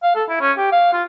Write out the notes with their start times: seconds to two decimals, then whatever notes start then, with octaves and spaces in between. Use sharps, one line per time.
0.03 F5
0.15 A4
0.29 E4
0.40 C#4
0.58 G4
0.72 F5
0.93 F4